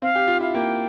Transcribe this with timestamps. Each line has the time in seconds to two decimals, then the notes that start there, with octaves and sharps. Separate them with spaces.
0.02 C4 F5
0.15 G4
0.28 F4
0.40 E4 F5
0.54 A#3 G5